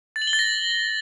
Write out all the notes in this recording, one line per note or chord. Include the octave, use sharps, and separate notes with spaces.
A6
F#7
G7
A6
A#6